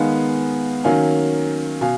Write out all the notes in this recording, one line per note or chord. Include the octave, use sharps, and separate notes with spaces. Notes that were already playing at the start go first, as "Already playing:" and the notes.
Already playing: D#3 G#3 B3 D#4 F5 G#5
D#3 F#3 A#3 C#4 F5 G#5
B2 F5 G#5